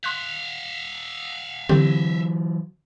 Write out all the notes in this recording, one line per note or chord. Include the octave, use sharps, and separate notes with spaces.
E5 F5 C6 F#6
D3 E3 F#3 C4 G4